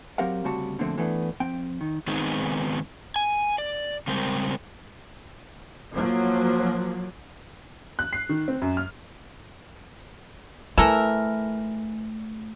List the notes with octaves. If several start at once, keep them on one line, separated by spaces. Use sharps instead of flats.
F#3 C4 G4 A#4 F5 F#5
D2 C#3 G3 C4 F#4 A5
B2 D3 F3 A3 A#3 C4
E3 A3 B3 D4
F2 C4 G5
D#3
D#3 G#3 B3 C4 D#4
G#5
D5
C#3 G3 G#3 C4 A#4 C5
F3 F#3 A#3
F#6
C7
D#3
C4
F#2
F6
E3 A3 A4 A#4